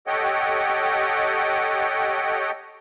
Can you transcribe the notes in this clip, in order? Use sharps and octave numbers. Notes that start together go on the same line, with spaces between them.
G4 A4 C#5 D#5 F#5 G5